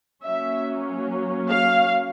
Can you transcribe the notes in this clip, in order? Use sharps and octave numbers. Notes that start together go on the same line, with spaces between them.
F#3 A#3 C#4 E5
F5